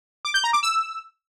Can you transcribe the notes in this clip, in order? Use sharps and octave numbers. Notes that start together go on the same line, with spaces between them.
D6
G6
A#5
D6
E6